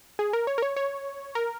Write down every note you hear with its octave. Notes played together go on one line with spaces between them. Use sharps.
G#4
A#4
C#5
A#4
C#5
C#5
A#4